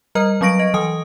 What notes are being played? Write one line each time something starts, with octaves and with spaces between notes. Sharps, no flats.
G3 A#4 D#5 A#5 F6
F#3 C4 C#6 A#6 D7
D#5
E3 G#5 D#6